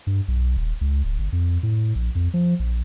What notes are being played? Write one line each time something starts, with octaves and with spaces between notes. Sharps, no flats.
G2
B1
D#1
C#2
D1
G1
F2
A2
A#1
F2
F3
A#1